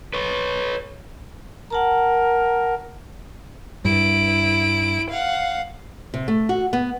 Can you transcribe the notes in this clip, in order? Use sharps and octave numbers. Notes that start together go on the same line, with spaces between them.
B4 C#5
A#4 F#5 A5 A#5
G2 E4 D7
F5 F#5
C3
A3
F#4
B3